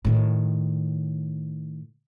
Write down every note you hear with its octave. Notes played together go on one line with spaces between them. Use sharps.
A2 D#3